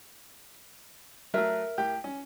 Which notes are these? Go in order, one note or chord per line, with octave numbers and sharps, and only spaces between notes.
F#3 A3 A#4 E5
A2 G4 G5
C#4